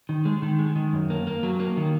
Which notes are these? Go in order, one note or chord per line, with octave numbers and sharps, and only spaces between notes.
D#3
G#3
D#3
G#3
D#3
F#2
A#3
A#3
F#3
A#3
D#3